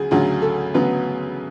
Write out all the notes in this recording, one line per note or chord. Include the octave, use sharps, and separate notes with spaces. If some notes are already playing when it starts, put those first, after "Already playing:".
Already playing: D2 C#3 F#3 G#4
D2 C#3 F#3
A4
D2 C#3 F#3 B3 B4